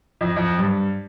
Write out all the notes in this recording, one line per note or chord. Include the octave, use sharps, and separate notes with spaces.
F2
F2
G2